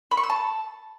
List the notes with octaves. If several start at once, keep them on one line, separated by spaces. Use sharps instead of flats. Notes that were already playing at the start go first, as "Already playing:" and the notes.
B5
C#6
E6
A5